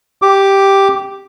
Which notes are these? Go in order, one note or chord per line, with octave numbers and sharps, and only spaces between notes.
G4 D6